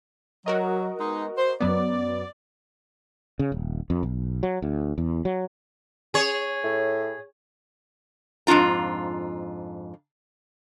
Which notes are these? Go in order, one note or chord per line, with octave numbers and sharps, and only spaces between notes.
F#3 F#4 A#4 D#5
G#3 B3 D#4
C5
F#2 F#3 B3 D5
C#3
D#1
F2
B1
F#3
D2
E2
F#3
G#4 C#5
A2
F2 G#2 D4 F4 A#5